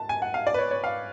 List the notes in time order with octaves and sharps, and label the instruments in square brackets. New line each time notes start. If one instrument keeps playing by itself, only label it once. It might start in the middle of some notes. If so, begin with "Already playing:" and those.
Already playing: [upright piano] A5
G#5
F#5
F5
D5
B4
C#5
C#5
F5